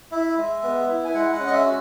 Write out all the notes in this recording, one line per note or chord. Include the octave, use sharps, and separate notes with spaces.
E4 E5
G#3
B3
E4
G#5
G#3 F#5
F#5
C#4
D#5
E5
F#4